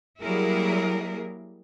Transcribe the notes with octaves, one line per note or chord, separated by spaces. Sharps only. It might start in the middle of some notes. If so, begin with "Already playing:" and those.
F#3 G3 A#3 E4 G#4 A#4